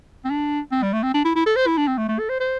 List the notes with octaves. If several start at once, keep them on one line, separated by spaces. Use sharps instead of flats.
C4
D4
C4
G3
A3
C4
D4
E4
E4
A4
C5
E4
D4
C4
A3
A3
A4
C5
C5